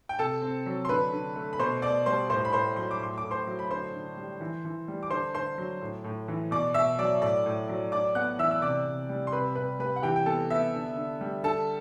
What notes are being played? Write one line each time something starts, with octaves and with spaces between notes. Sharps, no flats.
G5
C3 A4 A5
C4
F#3
C6
D3 B4 B5
D3
A3
B5
B2 C5 C6
B2 D5 D6
G3 C5 C6
A2 C5 C6
B5
A2 C5 C6
F#3 C6
D6
A2 C6
D6
A2
C5 C6
F#3
B5
D3 C5 C6
D3
G3
E3
E3
G3
D6
D3 C5 C6
D3 C5 C6
F#3
A2
A2
E3
B2 D5 D6
B2 E5 E6
F#3 D5 D6
A2 D5 D6
A2
F#3
A2 D5 D6
B3 F#5 F#6
E3 E5 E6
E6
C3 D5 D6
C3
G3
C6
C3 B4 B5
C3 B4 B5
G3 B4 B5
F#5
E3 G4 G5
G5
B3 A4 A5
B3 E5
D3
D3
G3
D3 A4 A5